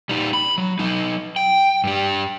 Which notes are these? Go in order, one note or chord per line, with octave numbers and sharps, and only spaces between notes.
G3 D#4
B5
F#3
F#3 D#4
G5
G2 G3